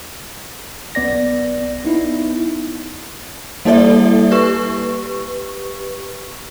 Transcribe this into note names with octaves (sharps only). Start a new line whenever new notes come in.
B1 B3 D5 A#6
B3 D#4 E4
G3 A#3 E4 A4 D5 E5
G4 B4 C#6